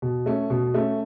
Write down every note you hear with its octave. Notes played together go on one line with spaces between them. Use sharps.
B2
A3 C#4
B2
A3 C#4